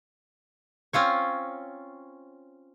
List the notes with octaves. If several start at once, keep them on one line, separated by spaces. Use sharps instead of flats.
C4 C#4 F4 C#5